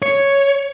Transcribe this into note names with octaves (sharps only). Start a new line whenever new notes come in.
C#5